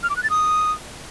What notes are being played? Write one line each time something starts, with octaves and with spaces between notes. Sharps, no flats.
F6
D6
F#6
A6
D#6